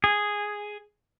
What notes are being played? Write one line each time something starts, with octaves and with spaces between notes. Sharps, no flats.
G#4